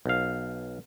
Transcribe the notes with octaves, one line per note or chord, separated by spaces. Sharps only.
B1 F5